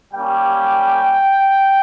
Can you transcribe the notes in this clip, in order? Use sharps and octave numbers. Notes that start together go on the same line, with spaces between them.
G3 A#3 C#4 G4 G5